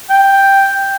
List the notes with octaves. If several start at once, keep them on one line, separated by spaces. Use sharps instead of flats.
G5